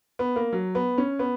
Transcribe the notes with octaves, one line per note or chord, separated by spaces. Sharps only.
B3
A#3
F#3
B3
C#4
B3